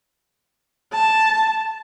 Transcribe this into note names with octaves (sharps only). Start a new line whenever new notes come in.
A5